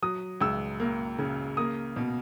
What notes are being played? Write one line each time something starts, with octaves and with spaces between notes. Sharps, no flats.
F#3 D#6
C#2 E6
A#3
C#3
A#3 D#6
B2